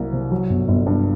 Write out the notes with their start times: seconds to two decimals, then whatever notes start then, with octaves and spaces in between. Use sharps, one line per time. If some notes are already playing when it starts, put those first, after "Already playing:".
Already playing: C2 F#3 A#3
0.13 C3
0.31 F#3
0.49 G1
0.68 G1
0.86 G2